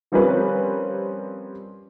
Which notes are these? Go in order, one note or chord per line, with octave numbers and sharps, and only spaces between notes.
F3 G3 C4 C#4 A#4 B4